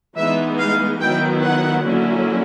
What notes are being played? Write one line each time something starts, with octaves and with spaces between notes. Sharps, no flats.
E3 G#3 B3 D#4 E5
F5
D#3 F#3 B3 E4 G5
F#5
D3 F#3 A#3 C#4 E4